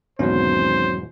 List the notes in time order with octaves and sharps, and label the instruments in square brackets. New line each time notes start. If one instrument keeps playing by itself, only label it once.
[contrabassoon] G#1 [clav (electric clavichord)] E2 G#2 B2 [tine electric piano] F#3 C#4 [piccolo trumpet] C5